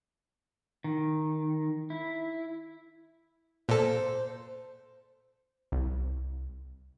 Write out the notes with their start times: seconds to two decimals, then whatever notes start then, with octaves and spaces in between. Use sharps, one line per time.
0.84 D#3
1.90 E4
3.69 A#2 A4 C5
5.72 C2